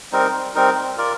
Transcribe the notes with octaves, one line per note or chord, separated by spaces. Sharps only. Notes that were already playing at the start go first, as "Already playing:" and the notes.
G3 C4 D#4 A#4
G3 C4 D#4 A#4
F4 A#4 D5